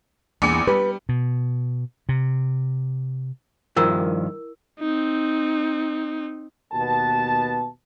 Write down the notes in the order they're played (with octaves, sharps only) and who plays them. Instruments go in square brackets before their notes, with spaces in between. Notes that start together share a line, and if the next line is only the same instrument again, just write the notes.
[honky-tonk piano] A#1 D6 C#7 [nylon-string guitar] E2
[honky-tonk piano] G3 [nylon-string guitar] B4
[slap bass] B2
C3
[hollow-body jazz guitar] G2 D#3 F3 [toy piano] E4 A#4 E6
[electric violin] C4 D#4
[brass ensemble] D#2 B2 B3 A5